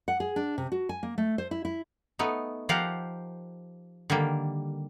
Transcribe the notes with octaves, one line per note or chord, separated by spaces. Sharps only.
F#5
G#4
D4
C3
F#4
G#5
A#3
A3
C5
E4
E4
A3 B3 D#4
F3 G4 A#4 F5 F#5
D3 D#3 G3 A#3